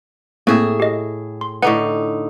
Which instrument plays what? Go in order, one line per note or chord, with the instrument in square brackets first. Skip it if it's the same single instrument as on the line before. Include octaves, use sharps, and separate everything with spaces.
[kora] A2 G#4 E5 [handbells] A#3 C4
[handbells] G4 D#5
C6
[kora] A2 D3 D#4 [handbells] B4 F#5